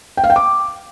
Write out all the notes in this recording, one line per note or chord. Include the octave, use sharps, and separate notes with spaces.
G5
F5
G5
D6